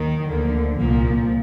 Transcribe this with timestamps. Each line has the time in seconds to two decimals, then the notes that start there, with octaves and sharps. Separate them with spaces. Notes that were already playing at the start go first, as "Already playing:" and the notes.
Already playing: D#2 D#3
0.30 D2 D3 F3 A#3
0.79 C2 A#2 F3 A#3